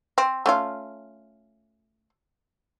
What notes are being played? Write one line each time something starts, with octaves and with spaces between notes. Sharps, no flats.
C4
A3 C#4 F4